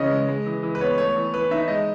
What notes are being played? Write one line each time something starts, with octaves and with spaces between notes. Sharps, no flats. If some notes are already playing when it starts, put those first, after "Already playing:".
Already playing: C#3 E3 C#4 D#5
G#3
G#3
E3
E3
B4
B3 C#5
A3 C#5
E3
E3 B4
D#4 E5
G#3 D#5